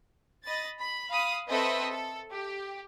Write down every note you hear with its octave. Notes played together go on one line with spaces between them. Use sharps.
D#5 B5 A6
B5
F5 B5 D#6
C4 A4 B4 D#5 E5
A4
G4